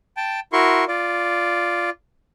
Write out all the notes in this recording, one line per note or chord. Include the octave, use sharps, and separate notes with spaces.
G5 A5
E4 F#4 A#4 C6 C#6
F4 D5